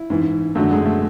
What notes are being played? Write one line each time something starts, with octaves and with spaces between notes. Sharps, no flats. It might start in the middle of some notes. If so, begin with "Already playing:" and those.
Already playing: E4
G#2 E3
F#2 D3 F#3 A3
G#3
A3